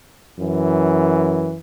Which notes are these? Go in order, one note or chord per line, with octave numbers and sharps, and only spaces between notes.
F#2 E3